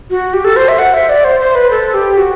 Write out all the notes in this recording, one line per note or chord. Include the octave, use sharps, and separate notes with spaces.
F#4
G4
A4
C5
E5
F#5
E5
D5
C5
C5
B4
A4
G4
F#4